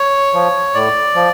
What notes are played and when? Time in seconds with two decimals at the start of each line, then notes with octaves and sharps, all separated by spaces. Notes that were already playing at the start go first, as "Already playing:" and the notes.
Already playing: C#5
0.34 F3
0.74 A2 D5
1.15 F3